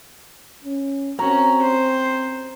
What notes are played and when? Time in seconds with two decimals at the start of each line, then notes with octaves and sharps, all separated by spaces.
0.64 C#4
1.19 C4 C#4 F#4 A#5
1.62 C5